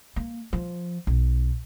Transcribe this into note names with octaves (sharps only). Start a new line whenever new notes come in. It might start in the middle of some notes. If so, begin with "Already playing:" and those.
A#3
F3
B1